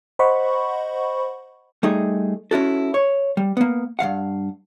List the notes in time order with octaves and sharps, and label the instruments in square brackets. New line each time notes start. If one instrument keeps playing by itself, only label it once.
[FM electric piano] C5 D#5 F#5 B5 C#6
[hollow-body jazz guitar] G3 A3 D#4 G#4
C#4 E4 F#4 A4
C#5
G3
A#3 B3
G2 C#3 F5 F#5